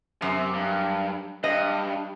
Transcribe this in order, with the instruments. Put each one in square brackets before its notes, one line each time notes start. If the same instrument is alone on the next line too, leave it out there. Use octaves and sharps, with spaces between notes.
[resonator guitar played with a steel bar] F#2 [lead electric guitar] C3
[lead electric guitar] G2
[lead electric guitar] G2 [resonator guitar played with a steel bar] D#5